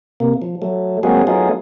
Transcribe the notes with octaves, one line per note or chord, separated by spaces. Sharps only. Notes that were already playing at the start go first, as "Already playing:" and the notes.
C3 A#3
F3
F#3 A3
F#3 G#3 A#3 C4 F#4 G#4
F#3 A3 B3 D#4 F4 G#4